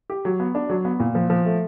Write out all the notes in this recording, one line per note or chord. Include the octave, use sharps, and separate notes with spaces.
G4
F#3
B3
D4
F#3
B3
A#2
F3
F3
A3